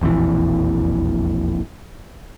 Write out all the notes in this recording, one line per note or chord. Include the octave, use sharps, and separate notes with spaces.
E1 A#1 F2 E3